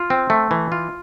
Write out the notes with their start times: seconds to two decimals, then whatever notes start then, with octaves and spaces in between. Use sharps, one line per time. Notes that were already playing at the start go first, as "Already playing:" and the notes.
Already playing: F4
0.10 C4
0.30 A3
0.51 E3
0.72 F4